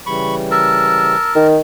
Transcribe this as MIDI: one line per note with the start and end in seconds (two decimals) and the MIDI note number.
0.06 1.16 49
0.06 1.16 52
0.06 1.16 55
0.06 0.35 83
0.06 0.35 85
0.51 1.48 70
0.51 1.48 81
0.51 1.32 88
1.36 1.60 51